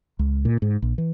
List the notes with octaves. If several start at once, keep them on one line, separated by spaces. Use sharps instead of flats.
C#2
A#2
G#2
A#1
E3